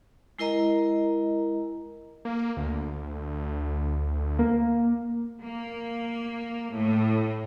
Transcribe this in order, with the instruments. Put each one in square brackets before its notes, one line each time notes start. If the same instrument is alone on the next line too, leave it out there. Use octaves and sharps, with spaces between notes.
[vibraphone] G#3 E4 A#4 D#5 A#5
[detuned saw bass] A#3
D2
[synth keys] A#3
[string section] A#3
A2